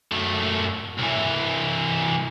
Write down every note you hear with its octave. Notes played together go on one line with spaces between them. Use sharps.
F#2 A3
C2 E3